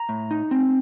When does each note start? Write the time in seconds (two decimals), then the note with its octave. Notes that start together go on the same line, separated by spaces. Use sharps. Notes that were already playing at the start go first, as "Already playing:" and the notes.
Already playing: A#5
0.09 A2
0.31 D#4
0.51 C4